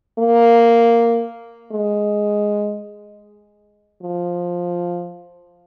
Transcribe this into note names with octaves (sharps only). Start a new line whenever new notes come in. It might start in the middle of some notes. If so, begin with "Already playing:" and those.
A#3
G#3
F3